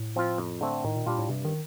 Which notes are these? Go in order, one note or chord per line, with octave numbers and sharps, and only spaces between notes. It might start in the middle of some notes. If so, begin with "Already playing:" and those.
Already playing: A2
F3 C4 F4
F2
D3 A3 C4
A2 D#3
A#2
A#2 G3 D4 F4
A2
G2 C3
D#3